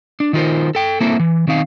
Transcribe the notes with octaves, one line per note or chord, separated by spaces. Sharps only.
D4
D#3 D#4 F4 A#4 C5
A4 G5
A#3 C4 E4 A4 E5
E3
D#3 C4 D#4 F5